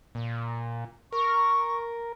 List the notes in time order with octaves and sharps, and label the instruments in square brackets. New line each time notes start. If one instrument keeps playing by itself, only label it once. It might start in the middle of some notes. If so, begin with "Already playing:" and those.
[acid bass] A#2
[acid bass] A#4 [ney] C#6